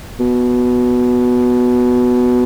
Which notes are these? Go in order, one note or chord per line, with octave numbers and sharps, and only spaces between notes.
B2